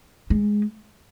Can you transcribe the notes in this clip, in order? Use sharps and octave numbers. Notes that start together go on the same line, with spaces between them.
G#3